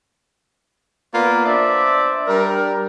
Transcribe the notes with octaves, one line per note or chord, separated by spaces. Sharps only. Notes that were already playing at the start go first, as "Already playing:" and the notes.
A#3 B3 F4 B4 D5
D4 C5 D5 E5
G3 D4 A#4